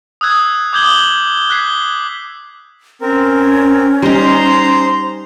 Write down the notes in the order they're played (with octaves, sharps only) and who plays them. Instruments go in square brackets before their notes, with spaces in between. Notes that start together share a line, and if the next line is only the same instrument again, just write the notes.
[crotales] D#6 E6 F#6 G#6
D6 D#6 G6 G#6 F#7 G7
F#6 G#6 B6 C7 G7
[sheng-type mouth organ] C4 A#4 [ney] C#4
[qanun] G3 D#4 [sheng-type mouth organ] C5 A#5 C6